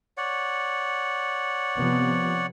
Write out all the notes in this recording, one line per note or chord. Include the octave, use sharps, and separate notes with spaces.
C#5 D5 F#5
C3 F3 B3